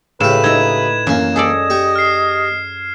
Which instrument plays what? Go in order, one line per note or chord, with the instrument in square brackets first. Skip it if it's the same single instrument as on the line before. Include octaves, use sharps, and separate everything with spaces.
[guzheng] A2 [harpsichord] C#3 G4 [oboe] B4 [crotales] E7
[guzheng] D#4 E4 [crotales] G#6
[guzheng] F#2 G#5 [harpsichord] E3 A#3
[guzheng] G#4 A4 D5 [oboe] D#5
[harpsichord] G4 C#6
[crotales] F6 C7